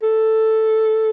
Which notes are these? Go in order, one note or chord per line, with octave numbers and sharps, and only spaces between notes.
A4